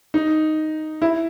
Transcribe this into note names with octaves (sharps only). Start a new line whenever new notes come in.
D#4
E4